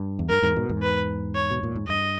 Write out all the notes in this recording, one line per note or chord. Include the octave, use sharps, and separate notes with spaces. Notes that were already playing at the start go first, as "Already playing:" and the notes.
Already playing: G2
E2
G2 A#4
E2 G#2
G#2 B2
E2 G#2
B4
C#5
B2
A#2
G#2
G2 D#5